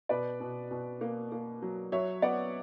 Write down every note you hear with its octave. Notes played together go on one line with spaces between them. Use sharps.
B2 B4 D5
B2
B2
A#3
A#3
F#3
F#3 C#5 E5
B3 D5 F#5